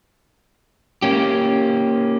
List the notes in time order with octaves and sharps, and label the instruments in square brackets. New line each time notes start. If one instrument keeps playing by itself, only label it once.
[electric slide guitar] A#3 C#4 G4